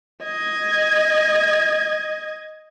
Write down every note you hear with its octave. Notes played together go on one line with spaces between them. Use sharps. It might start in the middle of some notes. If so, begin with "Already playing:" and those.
D#5 G#6